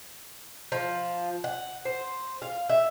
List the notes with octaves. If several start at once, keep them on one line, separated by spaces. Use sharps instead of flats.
F3
F#5
C5
F5
E5